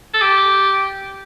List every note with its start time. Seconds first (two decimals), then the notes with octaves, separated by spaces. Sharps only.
0.14 A4
0.21 G4